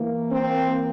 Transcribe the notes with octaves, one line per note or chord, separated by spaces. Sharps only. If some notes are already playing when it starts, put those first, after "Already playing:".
Already playing: E3 A#3
C4